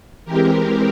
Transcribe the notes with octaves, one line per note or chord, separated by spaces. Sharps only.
E3 G#3 C4 G4 A#4